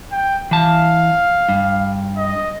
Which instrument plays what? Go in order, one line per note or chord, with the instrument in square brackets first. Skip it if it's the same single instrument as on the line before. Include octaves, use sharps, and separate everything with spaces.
[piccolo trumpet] G5
[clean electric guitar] E3 A5 [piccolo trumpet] F5
[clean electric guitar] G2
[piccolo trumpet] D#5